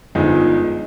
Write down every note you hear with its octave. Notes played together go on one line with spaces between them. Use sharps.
G1 G2 F3 G#3 D#4